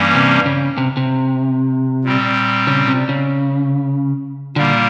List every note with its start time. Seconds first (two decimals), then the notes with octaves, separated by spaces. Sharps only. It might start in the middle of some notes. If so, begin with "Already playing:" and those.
Already playing: G2 E3 G3 A#3 C#4
0.15 C3
0.46 C#3
0.78 C3
0.97 C3
2.04 A#2 G3 C4
2.67 C#3
2.88 C3
3.09 C#3
4.56 A#2 D3 G3 A#3